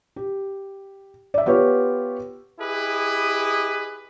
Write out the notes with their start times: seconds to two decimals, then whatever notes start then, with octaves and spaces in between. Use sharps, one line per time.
0.16 G4
1.34 D5 E5
1.46 B3 F4 G4 B4 C#5
2.60 E4 G4 G#4 B4 D#5